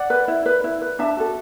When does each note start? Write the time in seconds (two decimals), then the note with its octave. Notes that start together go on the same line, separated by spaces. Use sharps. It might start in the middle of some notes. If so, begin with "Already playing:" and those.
Already playing: D5 F#5
0.10 B4
0.28 E4
0.46 B4
0.64 E4
0.82 B4
0.99 D4 E5 A5
1.17 F#4 A4